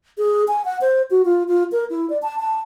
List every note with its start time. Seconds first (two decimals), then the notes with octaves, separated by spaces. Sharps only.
0.18 G#4
0.48 G#5
0.65 F#5
0.81 C5
1.11 F#4
1.25 F4
1.48 F4
1.72 A#4
1.90 E4
2.10 D5
2.22 A5
2.39 A5